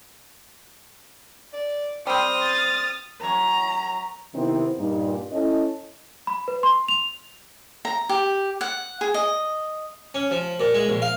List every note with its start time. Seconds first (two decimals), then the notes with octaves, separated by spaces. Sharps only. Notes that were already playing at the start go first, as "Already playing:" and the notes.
1.53 D5
2.07 G3 C4 C5 D#6 F6
2.42 A6
3.22 F#2 C#5 A#5
4.35 C3 D#3 B3 C4 D#4 E4
4.78 G2 A#2 D#4
5.32 C#4 E4 A4 D#5
6.27 B5
6.48 B4
6.63 C6
6.88 F7
7.85 A#5
8.09 G4
8.61 F#5
9.01 G#4
9.14 D#5
10.15 C#4
10.31 F3
10.60 A#2
10.74 G#3
10.89 A#1
11.02 F5